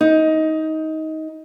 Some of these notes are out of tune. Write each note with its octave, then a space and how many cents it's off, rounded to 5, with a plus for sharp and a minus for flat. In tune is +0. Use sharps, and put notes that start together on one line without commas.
D#4 +20